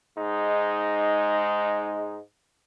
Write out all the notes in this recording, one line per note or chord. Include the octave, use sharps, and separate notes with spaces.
G#2 G#3 D#4